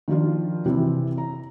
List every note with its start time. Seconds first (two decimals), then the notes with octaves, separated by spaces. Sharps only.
0.08 D#3 F3 D4 F4
0.66 C3 E3 C4 E4
1.18 A#5